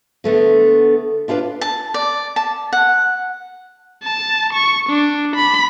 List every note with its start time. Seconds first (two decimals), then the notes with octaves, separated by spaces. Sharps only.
0.24 D3 A3 B3 A4
1.28 D4 E4 F4 B4 D5
1.61 A5
1.94 D5
2.36 A5
2.73 F#5
4.03 A5
4.53 C#6
4.89 D4
5.36 B5